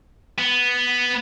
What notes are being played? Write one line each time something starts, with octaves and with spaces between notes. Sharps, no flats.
B3